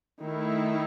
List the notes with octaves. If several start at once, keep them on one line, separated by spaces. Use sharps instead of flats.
D#3 A3 E4